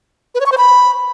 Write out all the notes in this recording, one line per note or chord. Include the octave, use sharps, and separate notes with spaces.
B4
C#5
C#6
C5
B5